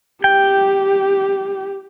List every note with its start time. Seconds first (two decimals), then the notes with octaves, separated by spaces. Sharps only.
0.24 G4 G5